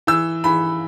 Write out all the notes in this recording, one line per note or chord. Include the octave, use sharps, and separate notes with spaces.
E3 E6
E3 B5